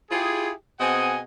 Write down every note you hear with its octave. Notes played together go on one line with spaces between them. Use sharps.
E4 F4 G4 G#4
B2 C4 G#4 D#5 F#5 G#5